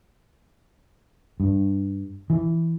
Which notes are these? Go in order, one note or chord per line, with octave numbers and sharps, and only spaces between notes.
G2
E3